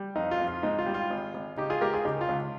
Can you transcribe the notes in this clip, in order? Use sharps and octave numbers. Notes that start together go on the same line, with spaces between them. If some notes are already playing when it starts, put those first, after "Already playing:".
Already playing: G3
F2 D#4
F4
F2
F4
G#2 D#4
F4
G3
F4
G#1
G#1
C#3 D#4 G4
F4 G#4
G#3 G4 A#4
F4 G#4
C#2 D#4 G4
F4
C#2